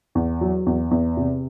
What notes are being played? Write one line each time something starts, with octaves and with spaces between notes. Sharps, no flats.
E2
F#3
E2
E2
C3